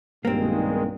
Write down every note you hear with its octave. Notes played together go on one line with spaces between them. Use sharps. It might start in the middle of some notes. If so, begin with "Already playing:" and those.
B1 G2 A#2 D#3 G#3 A#3 C4